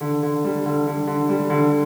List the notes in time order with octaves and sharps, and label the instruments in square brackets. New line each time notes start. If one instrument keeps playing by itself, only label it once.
[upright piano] D3
D3
G3
D3
D3
D3
G3
D3